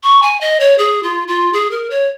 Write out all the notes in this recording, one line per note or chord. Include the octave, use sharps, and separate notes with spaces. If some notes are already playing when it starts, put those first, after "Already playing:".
C#6
G#5
D#5
C#5
G#4
F4
F4
G#4
A#4
C#5